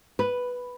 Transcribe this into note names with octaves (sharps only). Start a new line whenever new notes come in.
B4